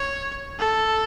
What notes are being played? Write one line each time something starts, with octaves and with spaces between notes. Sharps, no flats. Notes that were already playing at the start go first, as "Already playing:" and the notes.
Already playing: C#5
A4